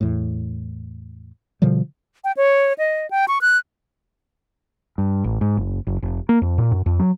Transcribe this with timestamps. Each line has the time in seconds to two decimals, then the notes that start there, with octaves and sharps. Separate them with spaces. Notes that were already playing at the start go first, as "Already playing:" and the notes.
0.01 E2 A2
1.62 B2 D3 F3 G3
2.24 G5
2.37 C#5
2.78 D#5
3.11 G5
3.28 C#6
3.41 F#6
4.98 G2
5.24 A1
5.41 G#2
5.57 F#1
5.87 F#1
6.02 F1
6.29 A#3
6.42 F2
6.58 A#2
6.71 F#2
6.86 F2
6.99 F#3